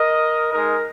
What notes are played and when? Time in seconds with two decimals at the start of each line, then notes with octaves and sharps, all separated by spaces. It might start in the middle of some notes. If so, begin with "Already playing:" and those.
Already playing: A#4 D#5
0.52 G#3 D#4 A#4